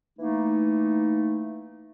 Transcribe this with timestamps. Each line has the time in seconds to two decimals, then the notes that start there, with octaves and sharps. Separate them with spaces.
0.19 E3 A3 A#3 D#4